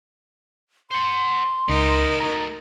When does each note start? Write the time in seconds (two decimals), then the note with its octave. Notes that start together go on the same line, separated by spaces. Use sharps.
0.91 C5 F#5 C6
1.69 C#2 D#4 E4 G4 A#4
2.20 F#3 A3 A#5